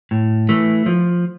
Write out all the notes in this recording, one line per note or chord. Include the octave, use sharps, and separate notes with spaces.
A2
E3 A3
F3